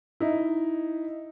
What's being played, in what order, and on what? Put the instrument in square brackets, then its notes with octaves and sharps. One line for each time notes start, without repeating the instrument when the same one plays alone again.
[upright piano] D#4 E4